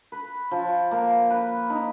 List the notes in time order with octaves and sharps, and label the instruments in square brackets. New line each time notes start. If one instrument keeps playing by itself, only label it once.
[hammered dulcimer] B4
F3
A#3
B4
D#4